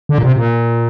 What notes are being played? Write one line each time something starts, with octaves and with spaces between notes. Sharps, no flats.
D3
A#2
C3
A#2